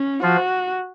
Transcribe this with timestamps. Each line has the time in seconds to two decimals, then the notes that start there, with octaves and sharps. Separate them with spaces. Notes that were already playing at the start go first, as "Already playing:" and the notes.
Already playing: C#4
0.23 F3 F4 F#4